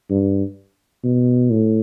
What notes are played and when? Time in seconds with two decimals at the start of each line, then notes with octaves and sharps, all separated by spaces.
0.10 G2
1.04 B2
1.50 A2